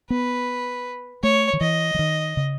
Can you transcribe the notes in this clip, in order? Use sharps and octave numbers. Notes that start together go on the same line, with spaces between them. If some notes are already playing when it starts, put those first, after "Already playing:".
B3 B4
A3 C#5
D#3
E3 D#5
E3
D#3
C#3